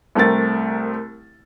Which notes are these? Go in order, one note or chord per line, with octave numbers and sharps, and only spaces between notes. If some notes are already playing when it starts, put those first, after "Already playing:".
C2 A3 C4 A#4 A6